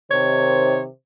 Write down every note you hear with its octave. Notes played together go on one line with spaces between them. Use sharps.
C3 D#3 C5 C#5